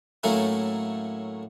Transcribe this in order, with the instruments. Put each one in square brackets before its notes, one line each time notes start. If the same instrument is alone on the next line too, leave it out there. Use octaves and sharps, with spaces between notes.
[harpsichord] A2 F#3 A3 A#3 C#4 E4